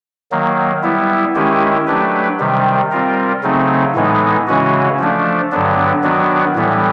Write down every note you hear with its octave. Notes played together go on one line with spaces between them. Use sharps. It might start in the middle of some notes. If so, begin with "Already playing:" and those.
D#3 F#3 A#3
G3 B3 E4
D#3 G#3 C#4 E4 G4
F#3 A3 D4 G4 B4
C3 D#3 G3
G3 C4 F4 A#4
C#3 F#3 A3 C4 D#4
A2 E3 G#3 B3 D#4
C#3 E3 G#3 C#4 F#4
F3 A3 D4
G2 D3 F#3 B3 D4
D#3 F#3 B3 D4 F#4
A2 E3 G3 B3